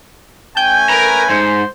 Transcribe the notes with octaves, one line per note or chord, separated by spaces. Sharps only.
A3 C#4 G5 G#5 G6
A#4 B4 A#5
G#2 C5